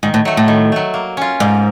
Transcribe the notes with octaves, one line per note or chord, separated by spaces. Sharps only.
G#2 D#3
A2
F#3 A3
A2
D#3
F#3 A3
A#3
C#4 F4
G#2 A#3